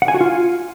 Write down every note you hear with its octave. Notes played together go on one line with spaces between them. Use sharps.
F#5
G#5
F#4
F4